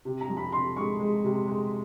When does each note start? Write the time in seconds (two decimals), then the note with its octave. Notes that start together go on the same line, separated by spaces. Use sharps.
0.05 C3
0.21 A#5
0.29 F2
0.37 B5
0.52 C3 C6
0.76 G#3 C#6
1.00 G#3
1.24 C3
1.47 G#3